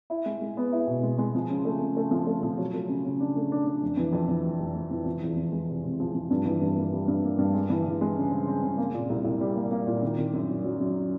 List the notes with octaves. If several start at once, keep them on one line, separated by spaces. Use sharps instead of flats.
E4
G#3
G#3
B3
E4
B2
G#3
G#3
F3
C#3
A3
C#3
A3
F3
A3
F3
F#3
A3
C#3
C#3
D4
A3
D4
D4
F1
E3
F2
E3
F1
F1
F1
E3
F3
E2
F3
G#3
C3
C3
F3
F3
G2
E3
G2
A#3
G3
G2
A#3
G2
G#3
E3
E3
G#3
C#3
C4
C4
C#3
A#3
A#2
C2
C2
G3
A#3
A#3
A#2
D#3
D#3
F#2
F#3
F#3
F#2